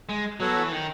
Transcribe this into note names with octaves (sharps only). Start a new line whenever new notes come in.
G#3
F#3 B3 F#4 A4 C#5 F#5
E3
D#3